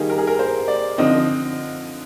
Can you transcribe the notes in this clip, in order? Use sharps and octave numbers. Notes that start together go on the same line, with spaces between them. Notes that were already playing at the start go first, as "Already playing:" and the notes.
Already playing: D#3 G3 A#3 D#4 G#4
A#4
G#4
A#4
C5
D5
D3 F3 C4 D#4 D#5